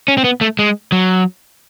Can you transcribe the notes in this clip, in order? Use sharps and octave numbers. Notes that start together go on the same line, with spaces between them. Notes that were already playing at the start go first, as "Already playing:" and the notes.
C#4
C4
B3
A3
G#3
F#3